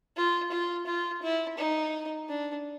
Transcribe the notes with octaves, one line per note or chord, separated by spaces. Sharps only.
F4
F4
F4
E4
D#4
D4